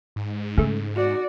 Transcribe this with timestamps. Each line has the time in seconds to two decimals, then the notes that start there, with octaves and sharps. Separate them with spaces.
0.16 G#2
0.58 C#3 A3 D#4
0.96 F#4 D5